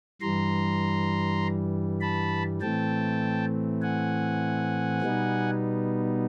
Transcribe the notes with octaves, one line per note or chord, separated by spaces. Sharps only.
G2 E3 G3 A#5 C6
A5 B5
A2 E3 A3 C4 G5 A5
F#5 G#5
B2 G3 B3 D#4